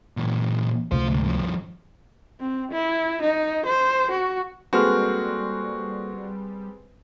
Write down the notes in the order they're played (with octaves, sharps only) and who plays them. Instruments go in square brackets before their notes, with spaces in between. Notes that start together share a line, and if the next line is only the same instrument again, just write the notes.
[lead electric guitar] A#2 E3
[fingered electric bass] C#2 C3 A3 [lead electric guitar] F4 C5
[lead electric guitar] D2 G#2
G2 F3
[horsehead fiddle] C4
E4
D#4
C5
F#4
[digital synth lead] G3 [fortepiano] G#3 C4 B4 [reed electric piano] A#3 A4 F6 [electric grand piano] F#4